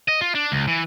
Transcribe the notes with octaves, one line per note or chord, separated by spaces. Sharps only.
D#5
F4
D4
C#2
E3